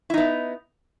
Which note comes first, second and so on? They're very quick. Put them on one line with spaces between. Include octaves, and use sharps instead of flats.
E4 D#4 B3